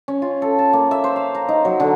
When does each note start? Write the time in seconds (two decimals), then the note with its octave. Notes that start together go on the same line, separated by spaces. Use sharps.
0.08 C#4
0.22 F4
0.42 A4
0.59 A5
0.73 A#3
0.91 E5
1.04 C5
1.16 F5
1.35 A#5
1.49 D#4
1.65 F#3
1.80 D3